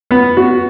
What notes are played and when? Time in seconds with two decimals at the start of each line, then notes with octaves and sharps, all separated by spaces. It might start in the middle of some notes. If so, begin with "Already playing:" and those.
0.11 B3
0.37 F#4